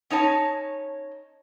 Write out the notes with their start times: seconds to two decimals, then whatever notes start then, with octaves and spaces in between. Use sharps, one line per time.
0.10 C#4 D#4 C#5 G#5 A5